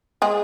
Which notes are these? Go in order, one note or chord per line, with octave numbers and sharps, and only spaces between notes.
G#3 G#4